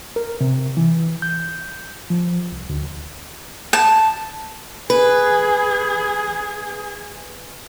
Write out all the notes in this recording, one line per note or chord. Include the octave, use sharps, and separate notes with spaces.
A#4
C3
E3
G6
F3
C2
D2
A5
G#4 B4